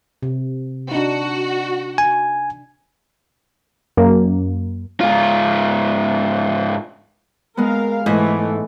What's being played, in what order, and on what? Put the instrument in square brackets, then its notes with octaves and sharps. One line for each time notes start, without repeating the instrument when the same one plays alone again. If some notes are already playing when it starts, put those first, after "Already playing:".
[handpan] C3
[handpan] D4 D#4 [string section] F#4
[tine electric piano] G#5
[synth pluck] F#2 A#3
[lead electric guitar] G#2 F4
[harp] G#3 B3 [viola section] A#4 F5
[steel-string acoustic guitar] G#2 [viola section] E3 A3 [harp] B4 D#5 G#5